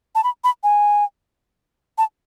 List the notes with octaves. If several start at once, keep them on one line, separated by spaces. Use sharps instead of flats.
A5
B5
B5
G#5
A5